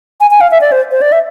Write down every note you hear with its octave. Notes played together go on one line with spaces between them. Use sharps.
G#5
G#5
F5
E5
D5
C5
C5
D5
E5